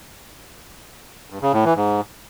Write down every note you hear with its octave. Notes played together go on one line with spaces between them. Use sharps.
G2
C#3
A2
E3
G#2